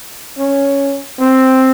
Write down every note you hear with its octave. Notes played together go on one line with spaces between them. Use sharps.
C#4
C4